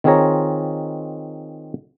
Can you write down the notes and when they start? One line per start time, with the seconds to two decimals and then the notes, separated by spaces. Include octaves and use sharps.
0.04 D#3 C4 F4 G#4 C#5 A#5